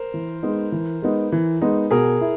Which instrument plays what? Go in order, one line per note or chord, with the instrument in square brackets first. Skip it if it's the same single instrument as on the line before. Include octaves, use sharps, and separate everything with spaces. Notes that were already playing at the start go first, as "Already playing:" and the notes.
Already playing: [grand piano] A#4 C5
[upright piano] E3
G#3 B3 D#4
E3
G#3 B3 D#4
E3
G#3 B3 D#4
[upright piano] B2 [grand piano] G#4 A#4
[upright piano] E4